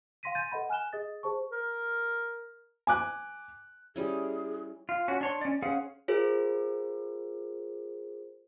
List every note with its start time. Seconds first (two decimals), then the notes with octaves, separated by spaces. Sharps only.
0.23 F5 G5 C6 A#6 B6 D#7
0.35 G#5 C6 G6 A6 A#6 D#7
0.52 A4 B4 D#5 F#5 B5
0.69 G#5 F6 F#6 E7 G7
0.93 G#4 D#5 D#6 A6
1.23 G#4 C5 A5 C#6
1.52 A#4
2.87 G#5 D6 F#6
3.96 G3 C#4 E4 G#4
4.89 F4
5.08 C#4 F#4
5.21 D4 C#5 C6
5.41 C#4 D5
5.62 C#4 G#4 C5 F5 F#5
6.08 F4 G#4 A#4 C5